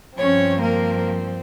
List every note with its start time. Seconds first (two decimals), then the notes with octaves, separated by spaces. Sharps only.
0.17 G2 F3 C4 C#4 C#5
0.61 A#3 A#4